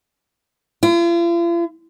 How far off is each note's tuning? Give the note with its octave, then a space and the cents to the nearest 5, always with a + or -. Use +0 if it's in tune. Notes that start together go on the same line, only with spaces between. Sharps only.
F4 -45